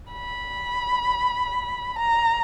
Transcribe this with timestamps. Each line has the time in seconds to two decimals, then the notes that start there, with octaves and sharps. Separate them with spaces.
0.12 B5
1.99 A#5